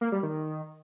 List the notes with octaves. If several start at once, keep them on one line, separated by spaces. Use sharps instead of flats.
A#3
G3
D#3